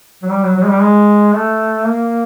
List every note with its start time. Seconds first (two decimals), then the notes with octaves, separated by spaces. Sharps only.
0.22 F#3
0.30 G3
0.43 F#3
0.56 F#3
0.63 G#3
0.69 G3
0.81 G#3
1.33 A3
1.85 A#3